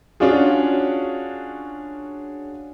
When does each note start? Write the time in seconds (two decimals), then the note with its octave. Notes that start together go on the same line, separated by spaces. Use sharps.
0.20 C#4 D4 F4 F#4 G#4